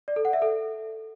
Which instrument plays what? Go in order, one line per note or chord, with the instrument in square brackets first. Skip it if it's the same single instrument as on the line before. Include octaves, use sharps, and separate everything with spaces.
[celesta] D5
A4
F#5
E5
A4